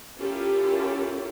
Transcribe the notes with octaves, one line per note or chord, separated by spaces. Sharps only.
C#4 E4 F4 G4 A4 A#4